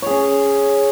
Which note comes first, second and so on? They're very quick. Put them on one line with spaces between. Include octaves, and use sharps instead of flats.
C#5 G#4 C#4